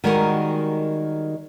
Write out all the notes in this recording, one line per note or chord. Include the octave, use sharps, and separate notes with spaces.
D#3 G3 G#3 D#4 F#4 A#4